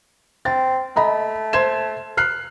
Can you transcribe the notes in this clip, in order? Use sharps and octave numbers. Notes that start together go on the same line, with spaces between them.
C4 A6
A3 D#5 A#5 B5
C5 G#6 E7
F6 F#6 C7